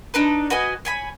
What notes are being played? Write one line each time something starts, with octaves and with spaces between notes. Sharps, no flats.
D4 D#4 B4
F#4 B4 D#5 G#5
C#5 G#5 B5